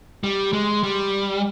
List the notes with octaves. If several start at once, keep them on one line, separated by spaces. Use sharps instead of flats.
G3
G#3
G3